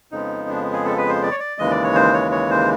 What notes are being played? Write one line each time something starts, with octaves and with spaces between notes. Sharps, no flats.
F2 C#3 F3 G#3 B3 D#4
D4
G#4
A4
B4
C5
D5
C#5
D5
D#2 C#3 E3 G#3 D#5
D5
C#5
C5
C#5
C#5
C5